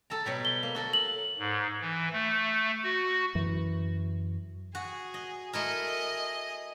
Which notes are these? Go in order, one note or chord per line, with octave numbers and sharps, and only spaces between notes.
A4 A5 A#5
B2 F#3 G3
G7
A#3
F#4 A4 A#4
F#7
G#2
E3
A3
F#4
F#2 E3
F#4 G#4
D#5
A3 E4 G#4 A#4 D#5